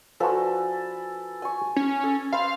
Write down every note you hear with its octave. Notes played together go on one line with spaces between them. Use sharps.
F3 D4 F#4 A4 B4 G#5
G#5 C#6
C#4
A4
C5 F5 B5